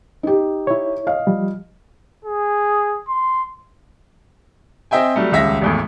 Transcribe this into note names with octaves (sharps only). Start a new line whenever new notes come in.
D#4 G4
E4 C#5
D#5 F5
F3 G3
G#4
C6
C4 D#5 E5 G5 G#5
F#3 G3 A3
D#1 C#2 E5 A#6 B6
G#1 E2 A2